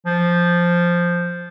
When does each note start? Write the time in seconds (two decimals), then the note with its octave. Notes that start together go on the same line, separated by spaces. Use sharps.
0.06 F3